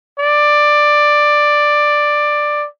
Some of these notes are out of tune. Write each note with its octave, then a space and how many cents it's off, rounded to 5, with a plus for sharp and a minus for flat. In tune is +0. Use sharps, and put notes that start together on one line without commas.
D5 +10